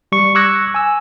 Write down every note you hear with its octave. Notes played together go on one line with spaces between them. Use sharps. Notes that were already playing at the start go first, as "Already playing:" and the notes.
G3 C#6
C#6 D6 E6 F#6 G#6 A#6
G#5 E6